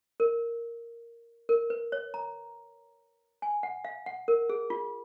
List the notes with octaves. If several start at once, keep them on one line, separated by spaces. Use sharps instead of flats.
A#4
A#4
B4
C#5
A#5
G#5
F#5
F5
F#5
A#4
G#4
F4